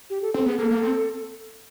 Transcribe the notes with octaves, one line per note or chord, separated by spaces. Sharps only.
G4
A4
C4 A4
B3 G#4
A#3 A4
A#3
C4